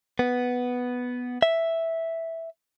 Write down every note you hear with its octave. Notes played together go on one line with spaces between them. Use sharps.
B3
E5